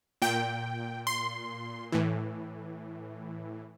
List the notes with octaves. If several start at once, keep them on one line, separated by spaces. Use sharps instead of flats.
A#2 G5
C6
A2 E3